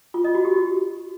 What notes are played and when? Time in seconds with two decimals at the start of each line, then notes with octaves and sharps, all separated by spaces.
0.14 F4
0.24 D#5
0.35 F#4
0.45 G4